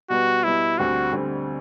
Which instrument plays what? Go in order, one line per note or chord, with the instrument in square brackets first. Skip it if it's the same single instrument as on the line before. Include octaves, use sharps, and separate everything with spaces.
[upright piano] B2 G3 B3 [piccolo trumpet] F#4
[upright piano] B2 G3 B3 [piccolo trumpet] E4
[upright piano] D2 D3 G3 C4 [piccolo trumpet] F#4
[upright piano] D2 D3 G3 C4